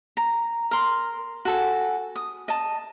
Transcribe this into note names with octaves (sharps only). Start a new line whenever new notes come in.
A#5
A#4 C6
F#4 A4 G#5
D#6
D#5 A5